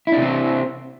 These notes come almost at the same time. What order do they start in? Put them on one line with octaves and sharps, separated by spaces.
E4 D4 C3 C4